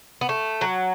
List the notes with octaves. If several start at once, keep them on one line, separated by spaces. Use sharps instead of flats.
B3
A3
F#3